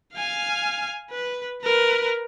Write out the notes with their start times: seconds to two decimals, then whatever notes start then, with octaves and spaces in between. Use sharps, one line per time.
0.14 F5 G#5
1.11 B4
1.63 A#4 B4